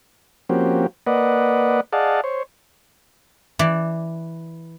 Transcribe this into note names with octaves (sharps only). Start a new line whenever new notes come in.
F3 A#3 C4 C#4 F#4 G4
A#3 B4 D5 D#5 F#5
G#4 D5 D#5 F5 F#5 A5
C5 C#5
E3 D5